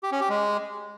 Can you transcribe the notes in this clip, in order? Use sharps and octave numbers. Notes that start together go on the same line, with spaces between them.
G4
C#4
G4
G#3